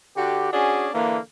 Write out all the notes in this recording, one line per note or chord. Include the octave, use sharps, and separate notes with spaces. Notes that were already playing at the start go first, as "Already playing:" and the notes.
D3 F#4 G4
C#4 D4 F#4 G#4
D3 E3 A#3